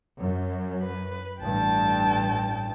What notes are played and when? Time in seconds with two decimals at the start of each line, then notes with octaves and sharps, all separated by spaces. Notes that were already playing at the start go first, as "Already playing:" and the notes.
0.20 F#2
0.83 B4
1.41 A1 G2 G5 A5